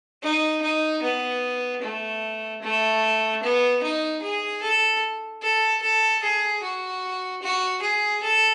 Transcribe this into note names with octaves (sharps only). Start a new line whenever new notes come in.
D#4
D#4
B3
A3
A3
B3
D#4
G#4
A4
A4
A4
G#4
F#4
F#4
G#4
A4